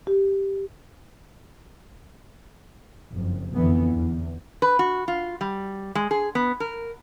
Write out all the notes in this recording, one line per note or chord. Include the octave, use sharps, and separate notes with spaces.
G4
F#1 F2
F2 D3 E3 B3
E2
B4
F#4
F4
G3
G#3
G#4
B3
A#4